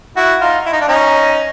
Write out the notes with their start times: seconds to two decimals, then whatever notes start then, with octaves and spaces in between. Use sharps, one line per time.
0.17 E4 F#4
0.41 D#4 F4
0.66 E4
0.73 D#4
0.81 D4
0.88 C#4 D#4